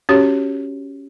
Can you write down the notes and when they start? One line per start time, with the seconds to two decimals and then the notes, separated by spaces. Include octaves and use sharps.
0.09 C#4 F#4 G4 C#5